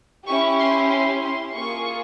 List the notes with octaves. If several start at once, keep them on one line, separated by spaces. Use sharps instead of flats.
C#4 E4 G4 C#6
C6
C6
C6
A#3 F4 G#4 C#6